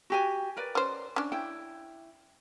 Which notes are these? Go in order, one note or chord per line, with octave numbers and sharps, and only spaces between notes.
F#4 G4 G#5
A#4 B4 D5
C#4 C5
C#4 D4
E4 G5